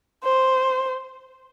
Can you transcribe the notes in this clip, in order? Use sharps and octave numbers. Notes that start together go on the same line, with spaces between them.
C5